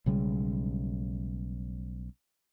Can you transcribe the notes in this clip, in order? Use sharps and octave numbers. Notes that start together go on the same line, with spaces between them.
B1 C#3 G3 G#3